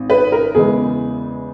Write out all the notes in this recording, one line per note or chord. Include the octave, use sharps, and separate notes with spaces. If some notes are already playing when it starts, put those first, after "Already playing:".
Already playing: G#1
B4
A#4
E2 C#3 E3 G#3 G#4